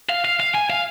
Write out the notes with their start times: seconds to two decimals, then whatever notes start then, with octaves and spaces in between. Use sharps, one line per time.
0.10 F5
0.25 F5
0.40 F5
0.55 G#5
0.70 F5